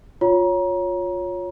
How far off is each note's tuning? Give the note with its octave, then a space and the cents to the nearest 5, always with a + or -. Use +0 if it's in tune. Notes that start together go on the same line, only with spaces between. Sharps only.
F4 +20 C#5 +0 A#5 +25